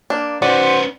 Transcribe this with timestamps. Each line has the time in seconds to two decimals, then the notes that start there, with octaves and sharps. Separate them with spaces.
0.10 A#3 D4
0.42 B3 C#4 F#4 C5 D5